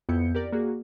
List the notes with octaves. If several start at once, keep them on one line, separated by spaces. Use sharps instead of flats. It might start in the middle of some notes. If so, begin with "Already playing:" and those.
F2 B3 E4 G6 C#7
G4 A#4 D5
A#3 F#4 G#4